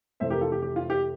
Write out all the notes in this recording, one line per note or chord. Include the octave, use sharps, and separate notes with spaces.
F2 C3 E3 A3 C5 E5
G4 A#4
F4 A4
G4
G4
F4
G4